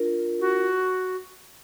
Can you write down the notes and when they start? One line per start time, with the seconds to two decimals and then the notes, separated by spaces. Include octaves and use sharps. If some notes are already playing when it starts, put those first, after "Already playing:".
Already playing: D4 F4 A#4
0.40 F#4